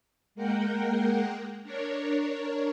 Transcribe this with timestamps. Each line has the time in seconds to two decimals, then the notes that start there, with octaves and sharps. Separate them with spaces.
0.35 G#3 A#3 A#4 F#5 G5
1.63 D4 A#4 C#5